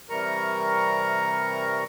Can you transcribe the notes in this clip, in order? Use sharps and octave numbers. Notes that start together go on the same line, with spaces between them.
C3 E3 G3 A#4 A#5 C#6